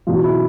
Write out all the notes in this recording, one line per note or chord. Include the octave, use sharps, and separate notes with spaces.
E2 B2 F#3 F4
E4